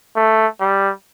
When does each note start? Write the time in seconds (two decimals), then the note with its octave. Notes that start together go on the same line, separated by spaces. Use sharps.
0.16 A3
0.60 G3